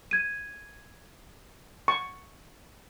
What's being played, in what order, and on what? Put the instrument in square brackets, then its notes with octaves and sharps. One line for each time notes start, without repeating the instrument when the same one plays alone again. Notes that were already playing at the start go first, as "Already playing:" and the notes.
[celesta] G#6 D#7
[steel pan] C#6